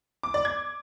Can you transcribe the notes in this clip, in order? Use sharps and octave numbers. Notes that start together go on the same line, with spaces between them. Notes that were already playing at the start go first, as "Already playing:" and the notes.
D6
D5
G#6